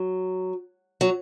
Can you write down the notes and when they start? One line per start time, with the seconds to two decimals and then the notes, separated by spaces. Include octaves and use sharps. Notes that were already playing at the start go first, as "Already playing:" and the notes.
Already playing: F#3
1.01 F#3